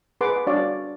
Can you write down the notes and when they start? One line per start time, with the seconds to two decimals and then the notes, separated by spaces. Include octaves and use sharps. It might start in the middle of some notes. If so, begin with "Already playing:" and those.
0.21 G#4 B4 F#5 C6 D6
0.47 D4 F#4 C#5 D5 F5